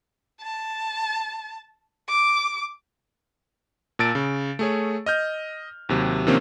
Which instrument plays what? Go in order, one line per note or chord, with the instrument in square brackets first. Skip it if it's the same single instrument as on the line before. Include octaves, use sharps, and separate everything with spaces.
[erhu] A5
D6
[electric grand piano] A#2 A5 E6 A6 D7
C#3
A3 G#4 C#5
D#5 F6 G6
D#2 C3 F#3
C3 D#3 F3 A#3 C4 C#4